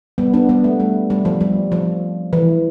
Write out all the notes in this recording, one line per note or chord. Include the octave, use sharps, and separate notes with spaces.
G3 B3
B3 D4
G3 B3
A3
G3
G3
F3
G3
F3
E3